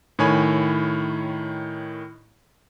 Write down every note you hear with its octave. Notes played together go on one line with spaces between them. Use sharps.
A2 D#3 C#5 G#5 B5